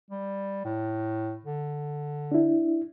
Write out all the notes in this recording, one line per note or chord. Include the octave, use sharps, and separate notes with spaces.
G3
A2
D3
D4 E4